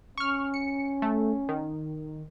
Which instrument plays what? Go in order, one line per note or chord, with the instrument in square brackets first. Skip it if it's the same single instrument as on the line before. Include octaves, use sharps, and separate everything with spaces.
[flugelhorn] C#4 [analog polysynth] C#6 F6
[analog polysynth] C#7
A3
D#3